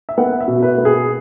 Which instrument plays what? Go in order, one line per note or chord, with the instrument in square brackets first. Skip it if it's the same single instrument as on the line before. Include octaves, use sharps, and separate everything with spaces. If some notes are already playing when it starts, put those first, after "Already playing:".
[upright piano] E5
B3 F#5
E5
B2
B4
B3
G#4